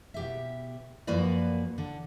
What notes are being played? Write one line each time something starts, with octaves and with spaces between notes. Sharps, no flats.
B2 G4 E5
F#2 F3 A#3 F#4 B4 D5
D3